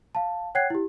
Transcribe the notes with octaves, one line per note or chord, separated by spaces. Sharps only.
F5 A5
C#5 F#5 G5 F#6 G#6 C7
E4 G4